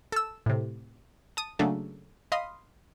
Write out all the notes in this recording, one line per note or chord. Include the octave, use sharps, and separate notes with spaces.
A4 E6
A2 C3
A5 D#6
C#3 F#3 A3 A#3 D4 A4
D#5 F5 B5 C6 D#6